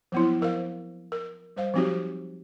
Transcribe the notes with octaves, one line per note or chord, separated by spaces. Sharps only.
F3 F#3 B3 C4 E4
F3 A#4 C5 F5
A#4
G3 C5 F5
F3 F#3 C4 D#4 F#4 G4